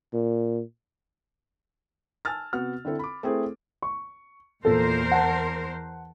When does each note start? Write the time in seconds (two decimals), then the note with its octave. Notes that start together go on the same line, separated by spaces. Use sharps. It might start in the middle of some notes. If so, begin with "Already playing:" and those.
0.13 A#2
2.25 G#5 A5 E6 F6 A6
2.53 C3 B3 F#4 F#5 F6
2.85 D3 C4 E4 A4
2.99 B5 D6
3.23 A3 C4 E4 G#4 A#4 C5
3.82 C#6
4.65 E2 A#2 A4 A#4 C5
5.12 F#5 A5